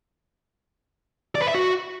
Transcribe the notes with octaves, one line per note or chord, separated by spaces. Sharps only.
D5
B4
E5
F#4